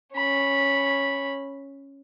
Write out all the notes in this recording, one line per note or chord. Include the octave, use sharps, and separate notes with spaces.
C#4 B5